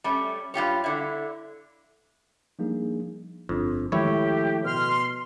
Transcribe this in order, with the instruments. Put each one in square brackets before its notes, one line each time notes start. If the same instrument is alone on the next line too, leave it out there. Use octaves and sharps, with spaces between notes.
[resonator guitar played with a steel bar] G3 A3 C#4
G2 F4 G4 C#5
D3 E4
[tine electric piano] F3 G3 A#3 D4 D#4 G#4
[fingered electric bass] G1 D4 [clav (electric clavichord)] F2
[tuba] A2 [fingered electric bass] D#3 F3 G#3 [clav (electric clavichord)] E4 C#5 [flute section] G4
[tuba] B2 [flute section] C6 F6